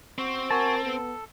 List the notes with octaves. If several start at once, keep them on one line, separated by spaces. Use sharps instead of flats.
C4 F#4
F#4 A#4 G#5 A5
B3 A4